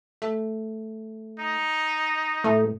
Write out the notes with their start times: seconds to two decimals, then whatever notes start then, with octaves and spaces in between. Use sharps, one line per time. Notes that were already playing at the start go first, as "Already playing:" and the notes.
0.22 A3
1.39 D#4
2.44 A2 A3